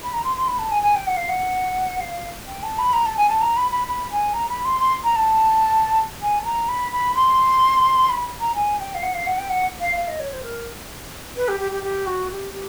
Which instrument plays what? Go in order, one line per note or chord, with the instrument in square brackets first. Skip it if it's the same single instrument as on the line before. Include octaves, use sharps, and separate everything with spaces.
[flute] B5
A#5
C6
C6
B5
A5
G#5
G#5
G5
F#5
F5
F#5
F5
G5
A5
B5
A#5
A5
G#5
A5
A#5
B5
B5
B5
G#5
A#5
B5
C6
C6
A#5
A5
G#5
A5
A#5
B5
B5
C6
B5
A#5
G#5
G5
F5
F#5
F5
F#5
G5
F#5
F5
F5
D#5
C#5
C5
A#4
B4
G4
G4
G4
G4
F#4
G4
G4